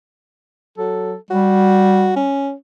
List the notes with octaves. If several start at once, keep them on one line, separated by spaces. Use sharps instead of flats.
F#3 A4
G3 F#4
C#4